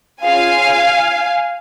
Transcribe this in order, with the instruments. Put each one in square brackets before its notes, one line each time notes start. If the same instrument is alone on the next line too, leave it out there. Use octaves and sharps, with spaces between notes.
[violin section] C#4 F4 G#4 F5 G#5